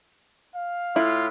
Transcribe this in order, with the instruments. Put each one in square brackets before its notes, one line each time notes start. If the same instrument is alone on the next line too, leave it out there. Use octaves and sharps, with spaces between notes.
[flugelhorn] F5
[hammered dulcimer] A2 [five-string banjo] E4 [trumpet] F4